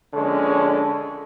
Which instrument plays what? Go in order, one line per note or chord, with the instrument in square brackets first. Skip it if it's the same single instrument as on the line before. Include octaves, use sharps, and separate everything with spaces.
[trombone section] A#1 D3 G#3 C#4